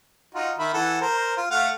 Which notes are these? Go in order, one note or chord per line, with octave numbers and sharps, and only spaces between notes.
D#4 F4 F#4
D#3 E5 B5
E3 A4 F#5
A#4 C5
F4
A3 F5 F#5